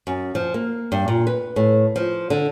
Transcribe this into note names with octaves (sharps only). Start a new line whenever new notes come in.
F#2
F3
A#3
G2
A#2
B4
A2
F3
D3